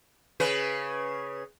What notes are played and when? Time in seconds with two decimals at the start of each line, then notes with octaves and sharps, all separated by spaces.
0.40 C#3 C#4 B4